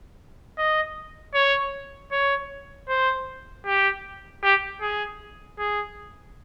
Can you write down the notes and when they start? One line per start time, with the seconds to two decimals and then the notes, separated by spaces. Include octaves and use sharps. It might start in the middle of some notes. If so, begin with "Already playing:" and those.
0.58 D#5
1.34 C#5
2.12 C#5
2.88 C5
3.66 G4
4.43 G4
4.81 G#4
5.59 G#4